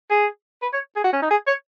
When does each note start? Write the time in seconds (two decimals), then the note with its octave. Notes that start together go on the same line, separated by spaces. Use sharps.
0.11 G#4
0.62 B4
0.73 C#5
0.96 G#4
1.04 F#4
1.13 C#4
1.22 D#4
1.30 G#4
1.47 C#5